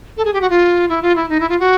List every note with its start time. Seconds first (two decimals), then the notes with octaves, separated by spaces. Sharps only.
0.17 A4
0.25 G#4
0.34 G4
0.41 F#4
0.50 F4
0.89 E4
1.02 F4
1.16 E4
1.29 D#4
1.40 E4
1.49 F4
1.60 F#4